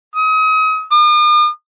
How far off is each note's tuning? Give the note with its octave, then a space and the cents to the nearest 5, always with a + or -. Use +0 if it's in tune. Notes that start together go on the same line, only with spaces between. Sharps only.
D#6 +35
D#6 -45